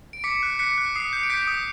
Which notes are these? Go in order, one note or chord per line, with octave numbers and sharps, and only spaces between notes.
D7
D6 B6 C#7
F#6
F#6 B6 C#7
F#6
D#6 C7
G6
D7
G6 B6 C#7
D#6